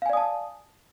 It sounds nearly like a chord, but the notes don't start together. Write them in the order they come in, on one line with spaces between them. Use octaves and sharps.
F5 G#5 D5 D#6 A5